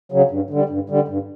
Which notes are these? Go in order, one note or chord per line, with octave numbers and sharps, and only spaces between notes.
C#3 F#3
G2
D3 G3
G2
D3 G3
G2